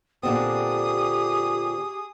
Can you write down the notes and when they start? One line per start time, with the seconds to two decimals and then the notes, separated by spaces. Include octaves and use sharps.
0.23 A#2 D3 C4 G4 G#4 D#6